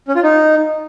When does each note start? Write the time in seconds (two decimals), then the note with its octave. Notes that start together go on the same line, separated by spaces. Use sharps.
0.08 C#4
0.16 F4
0.23 D#4